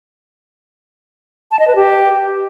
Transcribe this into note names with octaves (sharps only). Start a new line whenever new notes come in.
A5
D#5
B4
G4